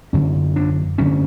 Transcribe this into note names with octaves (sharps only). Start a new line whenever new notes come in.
F#2 D3 C#4
D4
F#2 D3 C#4